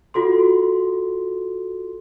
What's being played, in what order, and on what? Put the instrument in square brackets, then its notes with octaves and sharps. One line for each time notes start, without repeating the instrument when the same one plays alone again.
[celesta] F4 F#4 A4 C6